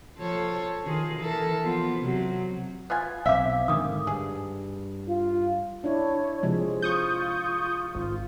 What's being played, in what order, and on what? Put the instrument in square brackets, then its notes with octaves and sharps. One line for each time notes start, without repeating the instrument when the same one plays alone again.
[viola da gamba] F3 A4 C#5
D#3 F4 G#4
E3 A4 A#4
F3 B3 F4
C3 F#3
[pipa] B3 F4 G#5
[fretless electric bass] B1 C4 [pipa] E5 [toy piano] F5 D6
[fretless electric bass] G#2 D3 D#3 [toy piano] D4 D6 D#6
[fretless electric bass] G2 [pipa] G#4
[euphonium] F4
[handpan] D4 E4 [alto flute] C#5
[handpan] C3 F3 G#3
[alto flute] F4 [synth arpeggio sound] C#6 D#6 G6
[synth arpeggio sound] G#1 [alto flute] F4